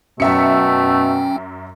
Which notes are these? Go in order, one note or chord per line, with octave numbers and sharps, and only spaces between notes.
F#2 B2 A3 C#4 E5 G5 C#7